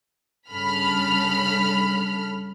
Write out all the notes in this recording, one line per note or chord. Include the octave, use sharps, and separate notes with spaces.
G2 C#3 A4 B5 F6